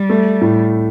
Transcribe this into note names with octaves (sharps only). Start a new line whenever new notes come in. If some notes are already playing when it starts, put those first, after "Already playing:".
Already playing: G3
A3
A2